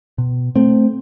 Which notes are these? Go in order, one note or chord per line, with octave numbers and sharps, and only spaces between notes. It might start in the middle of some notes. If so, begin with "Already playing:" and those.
B2
A3 C4